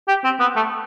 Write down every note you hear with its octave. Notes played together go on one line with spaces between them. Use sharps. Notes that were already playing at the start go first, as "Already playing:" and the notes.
G4
C4
B3
A3